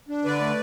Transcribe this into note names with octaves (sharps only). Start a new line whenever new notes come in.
D4
D3 B4 D5
A3